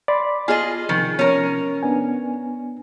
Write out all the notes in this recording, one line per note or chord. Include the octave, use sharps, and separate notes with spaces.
D5 B5 C6
F4 G#4 D#5 G#5
C3 D#3 F3
C#4 A#4
B3 D4 G#5